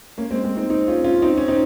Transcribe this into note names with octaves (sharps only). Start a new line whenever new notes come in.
A#3 C#4
G#3 C4
G#3 C4
C4 D#4
C4 D#4
C#4 F4
C#4 F4
C4 D#4
C#4
C4 D#4